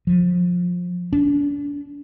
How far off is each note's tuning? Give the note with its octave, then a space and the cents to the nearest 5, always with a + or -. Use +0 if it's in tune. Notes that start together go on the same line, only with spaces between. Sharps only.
F3 +20
D4 -35